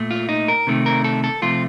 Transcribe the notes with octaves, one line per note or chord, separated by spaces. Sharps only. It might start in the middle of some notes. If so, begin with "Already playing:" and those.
Already playing: A#2 A3
F4
D#4
A#4
C3 D#3 A3
A#4
A4
A4
C3 F3 A3 F4